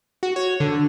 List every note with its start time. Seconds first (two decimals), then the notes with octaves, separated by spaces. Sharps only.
0.23 F#4
0.36 C#5
0.60 D3